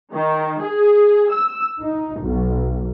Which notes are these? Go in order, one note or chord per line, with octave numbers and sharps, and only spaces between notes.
D#3
G#4
E6
D#4
B1